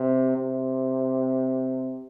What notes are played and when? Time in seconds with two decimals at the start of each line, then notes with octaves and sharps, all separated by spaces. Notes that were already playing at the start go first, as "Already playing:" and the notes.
Already playing: C3
0.37 C3